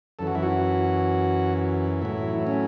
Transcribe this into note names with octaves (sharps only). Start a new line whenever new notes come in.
F#2 E3 A4
F#4
E4
F#4
A2 F#3 E4
C#4